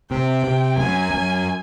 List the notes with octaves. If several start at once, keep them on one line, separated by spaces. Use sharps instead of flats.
C3 G5
C3
F#2 G#5
F#2